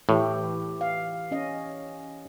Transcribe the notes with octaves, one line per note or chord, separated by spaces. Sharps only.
A2 E3 G4
F5
C#4 D#5